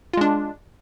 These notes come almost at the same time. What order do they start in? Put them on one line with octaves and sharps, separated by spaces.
F4 G#3 D4